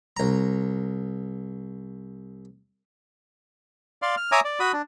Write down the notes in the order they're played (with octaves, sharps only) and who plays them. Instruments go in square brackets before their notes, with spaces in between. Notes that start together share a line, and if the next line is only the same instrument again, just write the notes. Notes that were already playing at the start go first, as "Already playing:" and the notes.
[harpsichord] C2 A#5
[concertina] D5 F5 C6
F6
C#5 E5 G#5 A#5 D6 D#6
D5
F#4 B5 D#6
D4